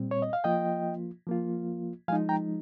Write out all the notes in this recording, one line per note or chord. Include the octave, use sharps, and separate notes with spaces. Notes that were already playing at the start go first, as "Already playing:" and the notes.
Already playing: A#2 G3 C4
C#5
D#5
F5
F3 A#3 F4 D#5 G5
F3 A#3 F4
F3 G#3 D#4 F5 G#5
G5 A#5